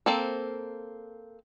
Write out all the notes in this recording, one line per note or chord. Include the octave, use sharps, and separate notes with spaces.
A#3 C4 A4